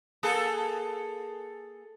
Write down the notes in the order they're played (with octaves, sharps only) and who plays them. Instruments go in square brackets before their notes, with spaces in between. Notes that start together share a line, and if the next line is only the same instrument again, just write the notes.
[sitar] A#3 G#4 A4